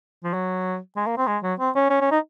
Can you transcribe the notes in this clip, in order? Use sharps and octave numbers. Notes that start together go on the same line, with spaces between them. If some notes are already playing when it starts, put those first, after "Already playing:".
F3
F#3
G#3
A#3
C4
G#3
F#3
C4
C#4
C#4
C#4
D#4